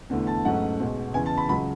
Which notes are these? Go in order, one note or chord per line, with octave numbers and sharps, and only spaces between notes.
E2 D3 A3 E4
A5
G#2 F#3 A3 C#4 F#5
B1 B2 G#3
E2 C#3 E3 G#5
A5
B5
C#2 C#3 F#3 B5